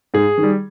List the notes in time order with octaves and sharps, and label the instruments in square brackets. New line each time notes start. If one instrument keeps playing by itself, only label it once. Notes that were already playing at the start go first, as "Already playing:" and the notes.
[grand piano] G#2 G#4
D#3
G3